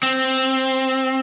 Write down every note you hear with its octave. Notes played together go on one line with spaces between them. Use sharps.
C4